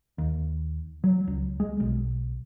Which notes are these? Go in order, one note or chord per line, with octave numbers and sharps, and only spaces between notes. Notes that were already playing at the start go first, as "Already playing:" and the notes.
D#2
F#3
C#2
G#3
B1